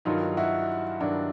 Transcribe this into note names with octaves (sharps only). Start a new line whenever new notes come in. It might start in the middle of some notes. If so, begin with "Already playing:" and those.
G2 D#3 F#3 D#4 F4
E4 F#4
G2 D#3 F#3 D4 E4